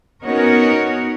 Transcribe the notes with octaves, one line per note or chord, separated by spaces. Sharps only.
B3 C#4 D#4 F#4 A#4 C#5